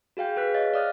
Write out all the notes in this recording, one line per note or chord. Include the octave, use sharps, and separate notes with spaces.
F#4 G#4 F5 G5 G6
G#4 B4 F#6 B6
C#5 D#5 F5 A6
D5 F5 D#6 F6 F#6 A6